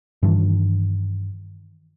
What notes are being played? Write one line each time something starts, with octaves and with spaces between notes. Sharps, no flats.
G2 D#3 E3 D4